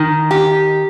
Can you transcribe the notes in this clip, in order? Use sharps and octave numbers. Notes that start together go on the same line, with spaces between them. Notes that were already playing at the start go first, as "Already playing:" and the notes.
Already playing: D#3
G4